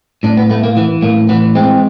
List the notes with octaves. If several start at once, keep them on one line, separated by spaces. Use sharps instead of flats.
A2 D4
B3
A3 B3
A#3
E3 B3
A2 A#3
E3 B3
G#3 C4